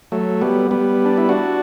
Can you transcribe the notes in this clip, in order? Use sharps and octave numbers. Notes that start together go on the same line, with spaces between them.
F#3 A3
G3 B3
G3 B3
D4
E4
D4 F#4